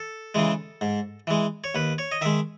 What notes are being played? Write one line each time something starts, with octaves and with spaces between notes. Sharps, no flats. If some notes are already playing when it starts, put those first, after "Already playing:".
Already playing: A4
C#3 E3 G#3
G#2
E3 G#3
C#5
D#2 B4
C#5
D#5
D#3 G#3 E5